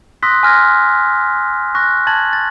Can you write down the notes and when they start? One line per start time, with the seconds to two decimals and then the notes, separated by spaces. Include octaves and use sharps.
0.23 C6 D#6 E6 F#6 A#6 B6
0.43 G#5 C6 F6 F#6 G#6 A#6
1.75 C#6 F#6 A#6
2.07 A5 G#6 A6 F#7
2.33 A6